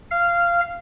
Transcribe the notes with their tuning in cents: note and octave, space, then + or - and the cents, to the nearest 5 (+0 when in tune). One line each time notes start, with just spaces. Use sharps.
F5 -15